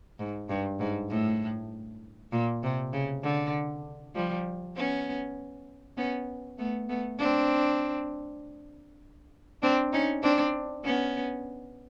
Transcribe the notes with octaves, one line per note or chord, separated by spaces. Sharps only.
G#2
G2
G#2
A2
A#2
C3
C#3
D3
F3 G3
B3 C#4
B3 C#4
A3 B3
A3 B3
C4 D4
C4 D4
C#4 D#4
C4 D4
B3 C#4